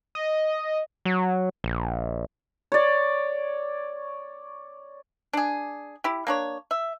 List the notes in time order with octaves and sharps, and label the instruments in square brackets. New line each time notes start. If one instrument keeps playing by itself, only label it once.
[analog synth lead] D#5
[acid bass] F#3
A#1
[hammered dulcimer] C#5 D5
[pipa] D4 G#4
E4 G4
A#3 D4 C#5
E5